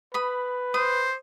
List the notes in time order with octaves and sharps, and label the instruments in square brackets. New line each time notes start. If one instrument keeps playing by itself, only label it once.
[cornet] B4 [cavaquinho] B5 D#6
[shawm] C5 [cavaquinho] D#6